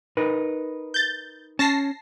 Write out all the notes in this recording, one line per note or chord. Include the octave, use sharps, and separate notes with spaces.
D#4 A#4 B4
G6 A6
C#4 A5 A#6 C7